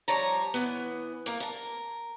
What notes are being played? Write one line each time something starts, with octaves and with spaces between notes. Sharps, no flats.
F3 G3 C#5 A5 A#5
E3 B3
A#3 A#4
A#4 A5